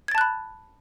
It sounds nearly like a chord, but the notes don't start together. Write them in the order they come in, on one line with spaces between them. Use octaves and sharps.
G#6 A6 A5 F#6 B5